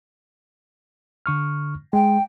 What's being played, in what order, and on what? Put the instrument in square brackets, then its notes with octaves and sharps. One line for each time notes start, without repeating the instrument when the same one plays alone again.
[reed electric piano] D3 C#6 F6
[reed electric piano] G#3 [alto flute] G5